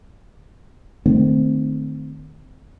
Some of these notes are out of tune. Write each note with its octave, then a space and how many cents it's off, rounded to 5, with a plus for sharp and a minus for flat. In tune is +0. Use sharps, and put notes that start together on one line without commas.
D#3 -35 A3 +0 C4 -15